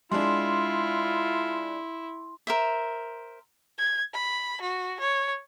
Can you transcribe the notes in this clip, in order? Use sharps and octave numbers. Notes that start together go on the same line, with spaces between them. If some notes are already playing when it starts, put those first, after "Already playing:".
G#3 D4 E4 F4 C6
A#4 C5 E5
G#6
B5
F#4
C#5